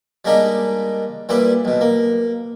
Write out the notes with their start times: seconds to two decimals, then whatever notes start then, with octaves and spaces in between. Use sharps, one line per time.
0.25 G3 G#3 A#3 D4 D#4 G4
1.29 A#2 G3 E4 G4 B4
1.65 B1 B2
1.81 A#3